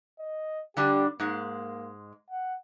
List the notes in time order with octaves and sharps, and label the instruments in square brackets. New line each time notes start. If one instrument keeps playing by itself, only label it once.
[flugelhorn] D#5
[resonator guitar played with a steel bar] D3 G3 D4 [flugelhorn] G4
[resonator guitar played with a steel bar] G#2 G#3 [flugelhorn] A#3
[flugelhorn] F#5